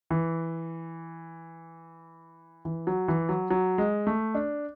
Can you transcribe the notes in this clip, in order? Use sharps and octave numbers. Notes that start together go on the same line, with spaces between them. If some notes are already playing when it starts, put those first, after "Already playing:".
E3
E3
F#3
E3
F#3
F#3
G#3
A3
D4